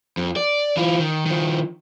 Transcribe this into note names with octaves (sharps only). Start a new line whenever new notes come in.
F2
D5
E3 F4
D#3
D#3 F3